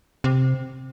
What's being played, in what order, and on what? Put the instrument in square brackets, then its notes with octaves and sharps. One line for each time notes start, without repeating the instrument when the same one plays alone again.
[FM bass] C3